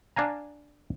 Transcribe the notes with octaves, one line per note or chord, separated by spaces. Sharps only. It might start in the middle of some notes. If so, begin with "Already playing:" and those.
D4 F5 G#5 A#5